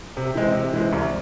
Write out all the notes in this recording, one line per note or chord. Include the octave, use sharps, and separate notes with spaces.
C3
E3 G#3 C4
C3
E3 G#3 C4
C2